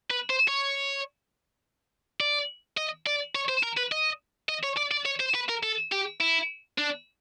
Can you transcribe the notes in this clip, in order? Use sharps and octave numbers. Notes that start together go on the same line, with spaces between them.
B4
C5
C#5
D5
D#5
D5
C#5
C5
A#4
B4
D#5
D#5
C#5
D5
D5
C#5
C5
B4
A#4
A4
G4
E4
D4